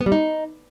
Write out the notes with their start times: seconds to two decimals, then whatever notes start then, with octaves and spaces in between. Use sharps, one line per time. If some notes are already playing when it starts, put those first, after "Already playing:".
0.01 B3
0.06 G3
0.12 D#4